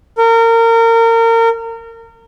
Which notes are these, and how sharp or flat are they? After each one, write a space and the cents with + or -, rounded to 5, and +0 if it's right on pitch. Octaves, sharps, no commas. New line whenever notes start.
A#4 -30